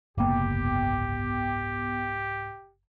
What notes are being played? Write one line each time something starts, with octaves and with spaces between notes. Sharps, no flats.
F#1 C2 G#2 A#3 B3 G4 G5 D6